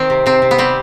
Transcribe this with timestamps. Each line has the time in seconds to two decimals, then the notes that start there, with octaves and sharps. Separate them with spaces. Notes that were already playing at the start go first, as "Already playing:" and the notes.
Already playing: D#3 C4
0.10 C3
0.26 C3 C4
0.42 C3
0.51 B3
0.58 G3 C4